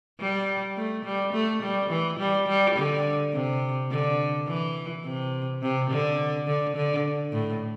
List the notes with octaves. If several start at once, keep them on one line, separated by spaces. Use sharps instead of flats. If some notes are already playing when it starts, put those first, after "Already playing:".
G3
A3
G3
A3
G3
E3
G3
G3
D3
C3
D3
E3
C3
C3
D3
D3
D3
A2